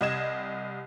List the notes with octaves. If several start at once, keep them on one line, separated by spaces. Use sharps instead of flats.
C2 G4 D#5 G#6 E7